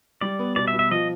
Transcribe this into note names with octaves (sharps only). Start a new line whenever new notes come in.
G3 D5
B3
B2 D5
E5
B2
E5
F3 D#5